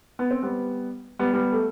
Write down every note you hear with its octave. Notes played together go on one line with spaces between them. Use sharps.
B3
C4
G3 B3
G3 B3
G3 B3
A3